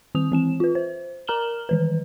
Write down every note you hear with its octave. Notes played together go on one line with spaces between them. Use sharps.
D#3 C4 D#6 F7
E3 C4 E7
F4 B4
C5
A#4 A#5 F6 E7 F#7 G7
D#3 E3 B4